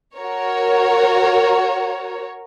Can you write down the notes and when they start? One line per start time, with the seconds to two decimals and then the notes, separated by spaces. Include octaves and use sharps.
0.17 F#4 A#4 C#5